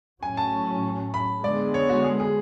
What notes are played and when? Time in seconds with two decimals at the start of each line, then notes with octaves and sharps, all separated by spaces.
0.22 A2 F#3 C#4 G#5
0.37 A5
1.14 B5
1.43 D3 G#3 B3 D5
1.74 C#5
1.89 F#4
2.04 G#4
2.20 G#4